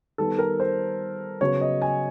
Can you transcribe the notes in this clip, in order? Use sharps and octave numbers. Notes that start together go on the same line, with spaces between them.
D#3 G3 B3 A4
A#4
C5
C#3 F#3 B3 C#5
D#5
G#5